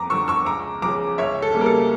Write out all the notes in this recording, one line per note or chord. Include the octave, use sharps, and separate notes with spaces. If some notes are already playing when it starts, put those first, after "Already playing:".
Already playing: F2 A#5 D6
D3 F3 C#6 E6
C#6 E6
C#2 A#5 D6
C#3 F3 A#5 D6
C#2 C#5 E5
A4
C#3 G3 A#3 C#4
A#4
A4